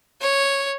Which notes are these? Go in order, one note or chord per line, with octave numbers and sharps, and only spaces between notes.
C#5